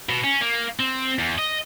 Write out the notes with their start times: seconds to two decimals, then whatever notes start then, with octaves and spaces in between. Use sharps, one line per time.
0.09 B2
0.24 C#4
0.41 A#3
0.80 C4
1.19 E2
1.38 D#5